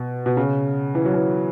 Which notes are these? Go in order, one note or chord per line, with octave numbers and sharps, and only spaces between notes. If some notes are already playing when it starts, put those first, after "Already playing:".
Already playing: B2
B2
C#3
E3
F#3
E3